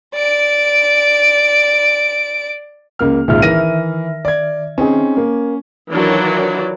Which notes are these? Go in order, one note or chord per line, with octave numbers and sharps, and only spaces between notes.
D5 D7
C#2 A#3 F6
G#1 C#2 A#2 D#3 E5 F6
E3 A#4 A#6 D#7
D5 G#6
C4 C#4 D#4 G#4
A#3
D#3 E3 F#3 D4 F4 D5